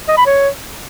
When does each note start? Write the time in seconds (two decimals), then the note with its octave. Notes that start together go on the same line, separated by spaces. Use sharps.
0.08 D#5
0.17 B5
0.26 C#5